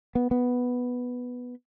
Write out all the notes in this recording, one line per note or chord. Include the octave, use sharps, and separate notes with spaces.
B3
B3